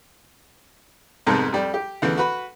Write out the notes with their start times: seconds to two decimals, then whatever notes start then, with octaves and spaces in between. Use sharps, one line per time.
1.27 C2 F2 G#2 G#3 B3 A5
1.53 F2 G3
1.74 G4
2.02 D2 C#3 E3 B3
2.17 F#4 B4 B5